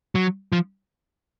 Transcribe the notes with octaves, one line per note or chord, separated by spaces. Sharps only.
F#3
F3